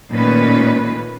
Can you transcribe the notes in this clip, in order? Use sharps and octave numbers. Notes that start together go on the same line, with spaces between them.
A#2 D#3 A3 A#3 C#4 B4